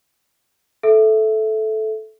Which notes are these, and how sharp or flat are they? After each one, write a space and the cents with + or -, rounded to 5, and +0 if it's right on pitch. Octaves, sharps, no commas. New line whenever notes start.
A4 -15 E5 +0